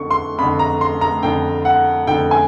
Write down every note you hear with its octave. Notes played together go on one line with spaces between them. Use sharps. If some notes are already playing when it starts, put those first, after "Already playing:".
Already playing: F2 D3 C#6
C6
F2 D3 B5
A#5
C6
A#5
F2 D3 G5
F#5
F2 D3 G5
G#5